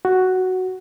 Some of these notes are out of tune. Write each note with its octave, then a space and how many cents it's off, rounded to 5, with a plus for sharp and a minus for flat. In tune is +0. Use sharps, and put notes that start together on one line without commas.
F#4 +5